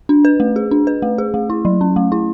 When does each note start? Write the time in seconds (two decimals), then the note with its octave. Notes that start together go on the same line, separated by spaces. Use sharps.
0.09 D4
0.25 B4
0.40 A3
0.56 G#4
0.71 D4
0.87 B4
1.02 A3
1.18 G#4
1.34 A3
1.50 E4
1.65 F#3
1.81 C#4
1.96 A3
2.12 E4